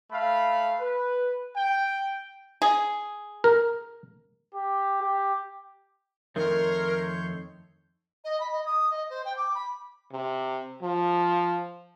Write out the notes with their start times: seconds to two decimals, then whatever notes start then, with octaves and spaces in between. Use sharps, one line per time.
0.12 A3 F5 B5
0.80 B4
1.55 G5
2.62 G#4
3.44 A#4
4.55 G4
5.02 G4
6.36 F2 D#3 A3 A#4 C#5 C6 G6
8.24 D#5
8.40 B5
8.52 D#5
8.65 D#6
8.90 D#5
9.09 C5
9.25 G5
9.36 D6
9.54 B5
10.12 C3
10.82 F3